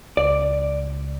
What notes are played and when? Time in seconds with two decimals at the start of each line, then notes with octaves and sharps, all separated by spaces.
0.17 C#2 D5